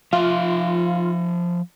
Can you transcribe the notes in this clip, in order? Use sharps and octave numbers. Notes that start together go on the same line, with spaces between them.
F3 F4 E5